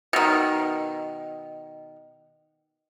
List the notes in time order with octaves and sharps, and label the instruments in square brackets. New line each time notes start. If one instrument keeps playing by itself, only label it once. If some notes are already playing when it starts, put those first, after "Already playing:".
[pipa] B2 D#3